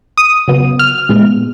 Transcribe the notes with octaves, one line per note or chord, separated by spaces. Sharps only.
D#6
C#3 F#3 B3
F6
A#2 G#3 B3